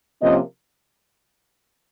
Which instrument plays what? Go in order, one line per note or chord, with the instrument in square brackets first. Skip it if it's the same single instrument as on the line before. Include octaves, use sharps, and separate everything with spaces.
[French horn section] C3 F3 A#3 C#4 D#5